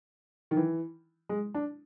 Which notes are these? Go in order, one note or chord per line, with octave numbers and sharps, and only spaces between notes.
D#3
E3
G#3
D4